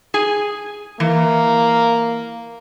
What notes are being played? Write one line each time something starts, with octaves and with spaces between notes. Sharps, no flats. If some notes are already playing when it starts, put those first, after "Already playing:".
G#4 G#5
E3 A#3